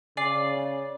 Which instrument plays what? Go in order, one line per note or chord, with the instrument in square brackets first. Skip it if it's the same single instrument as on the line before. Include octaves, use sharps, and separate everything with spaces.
[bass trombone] C#3 [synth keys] D5 A6 [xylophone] G#5 D6 C7